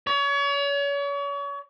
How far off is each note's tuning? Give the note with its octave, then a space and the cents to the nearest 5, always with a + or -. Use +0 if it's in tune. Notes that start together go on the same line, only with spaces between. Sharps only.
C#5 +35